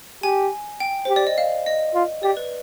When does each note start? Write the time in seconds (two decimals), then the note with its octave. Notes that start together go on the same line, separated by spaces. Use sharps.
0.23 G4 G#5
0.80 G5
1.05 G4 C5
1.16 D5
1.27 D#5
1.38 F5
1.66 D#5
1.94 F4
2.23 G4 D5
2.37 B4